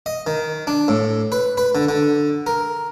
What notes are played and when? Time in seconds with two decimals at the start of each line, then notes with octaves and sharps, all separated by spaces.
0.06 D#5
0.27 D#3
0.67 D4
0.88 A2
1.32 B4
1.57 B4
1.75 D3
1.89 D3
2.47 A#4